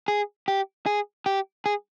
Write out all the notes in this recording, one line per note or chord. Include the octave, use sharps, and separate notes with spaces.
G#4
G4
G#4
G4
G#4